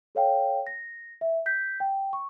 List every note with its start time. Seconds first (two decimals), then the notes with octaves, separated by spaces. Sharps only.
0.15 A4 C#5 F5 G5
0.67 A#6
1.21 E5
1.46 G6 B6
1.80 G5
2.13 C#6